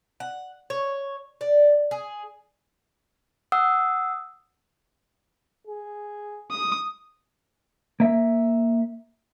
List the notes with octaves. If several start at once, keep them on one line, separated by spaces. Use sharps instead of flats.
F#5
C#5
D5
G#4
F#5 D#6 E6
G#4
D#6
A#3 E5